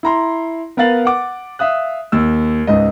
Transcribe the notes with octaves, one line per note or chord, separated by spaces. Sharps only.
E4 A#5 C6
B3 A#4 B4 F5 A6 F#7
F#5 D6
E5 F5 D#6 F#6
D#2 E6
C#2 G#2 D#5